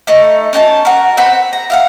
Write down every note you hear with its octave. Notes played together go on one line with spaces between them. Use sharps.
A3 D#4
C#4 D#4 G#5 A5
F#4 A#4
C4 C5 F#5 B5
A#5
E4 F5 F#5